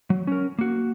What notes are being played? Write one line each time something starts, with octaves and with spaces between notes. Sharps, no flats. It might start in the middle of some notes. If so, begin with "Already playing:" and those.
F#3
C#4 A#4
A#3 F#4